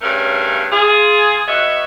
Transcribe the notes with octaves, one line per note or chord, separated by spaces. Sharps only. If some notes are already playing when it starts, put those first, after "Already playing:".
G2 C#3 A3 C#4 A#4
F4 G#4
B3 F#4 C#5 D#5 E5